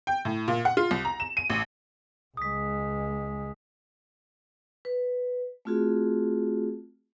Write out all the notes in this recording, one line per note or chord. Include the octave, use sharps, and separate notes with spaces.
G5
A2
A#2
F#5
F4
C2
A#5
E7
D#7
A1
C#2 G#3 D#6 B6
B4
A3 C4 F4 F#4 G#4